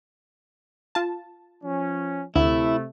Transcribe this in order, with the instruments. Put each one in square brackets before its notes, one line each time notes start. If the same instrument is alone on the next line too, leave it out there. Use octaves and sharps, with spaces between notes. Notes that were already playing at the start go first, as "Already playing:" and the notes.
[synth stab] F4 A5
[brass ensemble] F3 C#4
[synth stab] D2 [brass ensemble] C3 A3 [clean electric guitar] E4